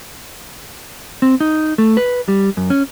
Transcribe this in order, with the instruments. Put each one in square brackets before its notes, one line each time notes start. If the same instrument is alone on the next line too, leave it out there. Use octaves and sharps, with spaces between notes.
[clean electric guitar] C4
D#4
A3
B4
G3
F#2
C#4